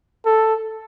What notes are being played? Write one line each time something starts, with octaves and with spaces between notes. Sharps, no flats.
A4